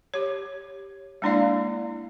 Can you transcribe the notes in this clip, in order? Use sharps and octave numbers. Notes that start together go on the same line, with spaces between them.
G4 C#5
G#3 A#3 D4 E4 D5 F5